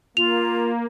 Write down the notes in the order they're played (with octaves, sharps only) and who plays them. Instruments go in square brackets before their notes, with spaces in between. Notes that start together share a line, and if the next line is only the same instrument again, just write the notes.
[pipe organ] A#3 [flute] F4 [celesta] F7